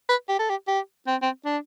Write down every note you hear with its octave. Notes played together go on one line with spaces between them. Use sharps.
B4
G4
A4
G4
G4
C4
C4
D4